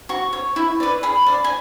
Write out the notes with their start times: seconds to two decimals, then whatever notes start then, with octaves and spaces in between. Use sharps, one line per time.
0.09 F#4 C#6
0.33 C#5
0.56 E4
0.80 B4 D5
1.03 G#4 B5
1.26 D5
1.44 G#5